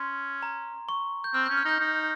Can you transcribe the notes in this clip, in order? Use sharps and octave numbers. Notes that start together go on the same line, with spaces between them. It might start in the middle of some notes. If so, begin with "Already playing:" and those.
Already playing: C#4 C6
A#5
C#6
G6
C4 F6
C#4 G6
F6
D#4 G6
D#4